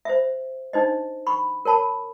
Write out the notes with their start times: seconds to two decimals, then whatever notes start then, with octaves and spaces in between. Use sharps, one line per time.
0.05 C5 E5
0.73 D4 D#4 C5 D#5
1.27 B5 C#6
1.65 A#4 C#5 A5 B5